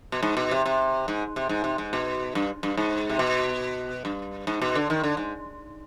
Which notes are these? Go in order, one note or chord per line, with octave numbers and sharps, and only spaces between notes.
B2
G#2
B2
C3
C3
G#2
C3
G#2
C3
G#2
B2
G2
G2
G#2
C3
B2
G2
G#2
B2
D3
D#3
D3
G#2